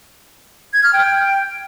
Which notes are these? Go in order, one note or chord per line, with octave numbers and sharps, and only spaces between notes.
G#6
F6
G5